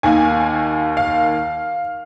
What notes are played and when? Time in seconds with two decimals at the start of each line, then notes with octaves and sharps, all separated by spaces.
0.03 D#2 D#3 A#3 G#5
0.97 F5